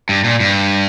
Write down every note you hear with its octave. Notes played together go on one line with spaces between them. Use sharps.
G2
A#2
G2